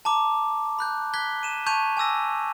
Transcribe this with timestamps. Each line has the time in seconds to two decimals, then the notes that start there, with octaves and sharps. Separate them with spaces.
0.05 A5 A#5 D6
0.79 B5 F#6 G6
1.14 F#6 G#6 B6 G7
1.43 D#7 E7
1.66 A5 C#6 G6 G#6 D#7 F7
1.97 G#5 D6 E6 A#6